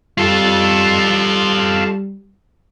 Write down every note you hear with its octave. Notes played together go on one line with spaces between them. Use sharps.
G3 F4 A4